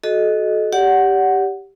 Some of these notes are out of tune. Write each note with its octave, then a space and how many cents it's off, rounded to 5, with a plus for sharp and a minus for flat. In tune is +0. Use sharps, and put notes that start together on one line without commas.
F#4 +0 A4 -30 D#5 +0
G4 +0 D5 -35 F#5 +0